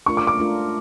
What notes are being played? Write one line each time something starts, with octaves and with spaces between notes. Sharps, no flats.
A3 D4 F4 A#4 C#6
D6
D6
A3 D4 F4 A#4